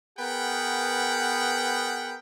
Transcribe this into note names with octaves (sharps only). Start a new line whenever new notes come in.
B3 G#4 A#4 B4 F#5 G5